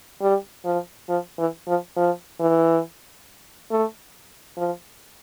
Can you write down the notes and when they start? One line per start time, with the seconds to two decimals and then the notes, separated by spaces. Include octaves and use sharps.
0.22 G3
0.65 F3
1.09 F3
1.38 E3
1.67 F3
1.96 F3
2.40 E3
3.71 A3
4.57 F3